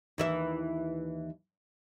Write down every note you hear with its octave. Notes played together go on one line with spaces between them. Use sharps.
D#2 E3 E5